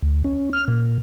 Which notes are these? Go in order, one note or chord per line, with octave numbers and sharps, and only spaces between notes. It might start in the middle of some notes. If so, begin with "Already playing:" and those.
D2
C#4
F6
A#2